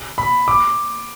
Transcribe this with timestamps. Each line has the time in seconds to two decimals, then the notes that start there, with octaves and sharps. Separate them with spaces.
0.18 B5
0.48 D6